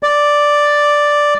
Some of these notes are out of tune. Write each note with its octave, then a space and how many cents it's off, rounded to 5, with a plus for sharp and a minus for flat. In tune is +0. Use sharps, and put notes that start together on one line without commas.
D5 +0